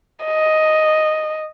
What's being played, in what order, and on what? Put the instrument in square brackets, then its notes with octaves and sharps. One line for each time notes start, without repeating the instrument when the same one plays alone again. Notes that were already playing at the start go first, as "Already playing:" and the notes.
[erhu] D#5